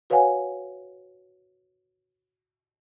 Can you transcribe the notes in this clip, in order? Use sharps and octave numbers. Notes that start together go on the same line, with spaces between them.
F#4 B4 C#5 F5 F#5 G#5